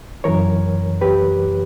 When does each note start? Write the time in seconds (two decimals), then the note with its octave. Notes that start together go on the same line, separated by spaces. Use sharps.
0.24 F#2 E3 A#4 C#5
1.01 G4 B4